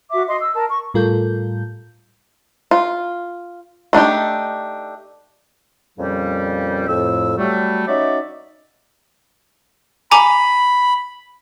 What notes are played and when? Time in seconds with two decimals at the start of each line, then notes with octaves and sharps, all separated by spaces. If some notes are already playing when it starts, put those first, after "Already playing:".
0.12 F#4 E5 D6
0.28 D#5 C6
0.41 E6
0.55 A#4 A5
0.68 C#6
0.94 A2 G3 F4 A4 A#4 G6
2.71 F4
3.93 A3 D4 D#4 G4
5.99 F2 A#2 C#3 G3
6.88 F2 A2 E6
7.38 F#3 G3 A3
7.87 C#4 D#4 F#4 C#5 D5 E5
10.11 G#5 A#5 B5 D6